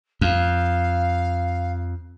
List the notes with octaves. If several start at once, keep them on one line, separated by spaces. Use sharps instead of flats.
F2 F5